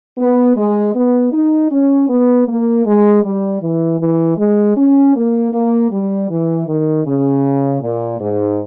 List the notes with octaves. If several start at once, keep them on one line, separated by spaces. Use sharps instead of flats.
B3
G#3
B3
D#4
C#4
B3
A#3
G#3
G3
E3
E3
G#3
C#4
A#3
A#3
G3
E3
D#3
C#3
A#2
G#2